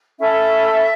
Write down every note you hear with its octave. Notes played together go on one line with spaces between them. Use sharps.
C#4 E4 A4 E5